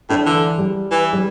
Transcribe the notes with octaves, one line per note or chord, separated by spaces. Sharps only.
A2 D4
D3 E3
G3
E3
G3